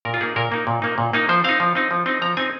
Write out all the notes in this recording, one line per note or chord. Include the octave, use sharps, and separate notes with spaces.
A#2 A#4
F4
A#3 D#4 G#4
A#2 A#4
A#3 D#4
A#2
A#3 D#4
A#2
A#3 D#4
F3 C5
C4 D#4 F5
F3
C4 D#4
F3
C4 D#4
F3 A#5
C4 D#4 G#5